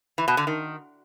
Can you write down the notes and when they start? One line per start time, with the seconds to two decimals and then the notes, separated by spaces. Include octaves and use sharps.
0.18 E3
0.28 B2
0.37 D3
0.47 D#3